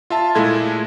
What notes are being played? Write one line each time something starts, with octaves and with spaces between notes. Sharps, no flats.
F4 E5 A5
A#2 G#3 A3 E4 A4 G#6